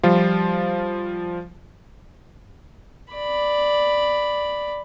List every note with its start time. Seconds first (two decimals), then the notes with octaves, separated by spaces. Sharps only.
0.03 F3 G3 F4
3.13 D5 B5